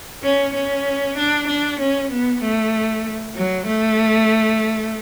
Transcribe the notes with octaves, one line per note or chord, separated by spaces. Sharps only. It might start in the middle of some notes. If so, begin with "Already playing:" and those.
C#4
C#4
D4
D4
C#4
B3
A3
F#3
A3